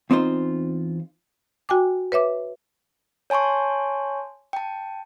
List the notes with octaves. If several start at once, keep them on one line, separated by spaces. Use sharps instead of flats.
E2 C4 D#4 F4 C5
F#4 G5 G#5 D6
B4 C#5 E5 D6
C#5 G#5 A5 C6 C#6
G5 A5